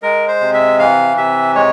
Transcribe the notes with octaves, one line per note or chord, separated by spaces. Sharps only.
G#3 A#4
C5
C3
E5
E3 F5
C3 E5
G#3 C#5